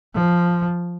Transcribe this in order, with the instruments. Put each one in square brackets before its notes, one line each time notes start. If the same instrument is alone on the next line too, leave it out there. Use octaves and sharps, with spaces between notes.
[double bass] F3